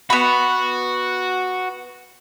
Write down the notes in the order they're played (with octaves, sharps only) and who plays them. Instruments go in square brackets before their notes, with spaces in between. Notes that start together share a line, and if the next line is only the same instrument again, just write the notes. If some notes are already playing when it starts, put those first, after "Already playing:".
[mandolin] B3 B5 [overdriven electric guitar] F#4